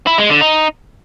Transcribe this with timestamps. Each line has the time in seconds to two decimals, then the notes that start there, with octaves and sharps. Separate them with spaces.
0.07 E4
0.18 G#3
0.30 D3
0.41 D#4